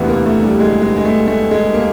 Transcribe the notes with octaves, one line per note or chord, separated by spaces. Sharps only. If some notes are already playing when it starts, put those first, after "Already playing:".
Already playing: E1 D2 C3 E3 B3
A#3
A3
G3
G#3
G#3
G#3
A3
A3
G#3
A#3